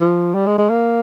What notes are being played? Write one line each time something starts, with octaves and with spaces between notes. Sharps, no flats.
F3
G3
G#3
G#3
A#3